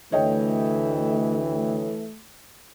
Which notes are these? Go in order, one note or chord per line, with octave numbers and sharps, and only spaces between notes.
D2 E3 A3 C#5 D#5 G5